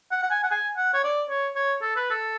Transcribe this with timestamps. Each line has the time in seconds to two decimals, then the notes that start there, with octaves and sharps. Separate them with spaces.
0.12 F#5
0.23 F#5
0.31 G#5
0.43 F#5
0.51 G#5
0.77 F#5
0.93 C#5
1.04 D5
1.29 C#5
1.56 C#5
1.82 A4
1.96 B4
2.10 A4